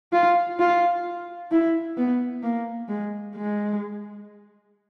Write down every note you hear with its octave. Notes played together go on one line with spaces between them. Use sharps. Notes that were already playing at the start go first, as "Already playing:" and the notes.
F4
F4
E4
B3
A#3
G#3
G#3